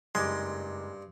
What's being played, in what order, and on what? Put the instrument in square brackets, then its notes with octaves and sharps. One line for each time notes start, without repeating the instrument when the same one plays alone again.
[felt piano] F#1 D6 [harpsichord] G2 C6 [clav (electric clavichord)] G#3